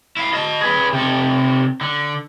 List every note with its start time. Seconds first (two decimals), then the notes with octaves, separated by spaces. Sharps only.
0.17 E4 F5
0.33 D#5 A5
0.61 G#4 B4
0.93 C3 A4
1.81 D3